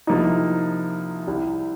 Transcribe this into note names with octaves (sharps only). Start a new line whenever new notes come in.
C2 C3 F3 A#3 D#4
C2 C3 G3